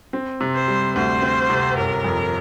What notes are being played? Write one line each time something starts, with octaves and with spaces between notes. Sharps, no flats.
C4
C3
C5
G3
D2 C5
C4
C3
G1 A#4
F2